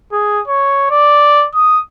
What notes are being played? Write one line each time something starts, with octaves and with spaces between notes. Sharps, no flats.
G#4
C#5
D5
D#6